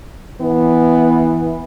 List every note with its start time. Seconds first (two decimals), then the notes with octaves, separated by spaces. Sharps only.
0.41 E3 B3